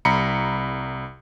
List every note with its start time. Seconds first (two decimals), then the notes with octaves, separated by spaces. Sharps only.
0.05 C2 A#5 B5 C#7